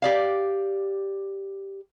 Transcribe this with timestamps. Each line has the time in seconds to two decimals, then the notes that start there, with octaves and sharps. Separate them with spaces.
0.02 G4 D5 F5